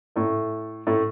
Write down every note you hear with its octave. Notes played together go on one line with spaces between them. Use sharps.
A2 A3
A2 A3